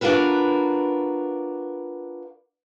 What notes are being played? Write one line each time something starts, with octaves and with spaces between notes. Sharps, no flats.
D4 F4 F#4 A#4 B4